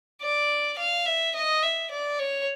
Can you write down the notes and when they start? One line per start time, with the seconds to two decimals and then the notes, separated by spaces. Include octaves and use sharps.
0.22 D5
0.78 F5
1.06 E5
1.35 D#5
1.63 E5
1.91 D5
2.19 C#5